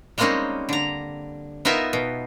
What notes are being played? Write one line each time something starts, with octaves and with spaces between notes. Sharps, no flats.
G3 G#3 A#3 C4 C#4 D#4
D3 A#5
B3 D#4 F4 A#4 E5 G#5
B2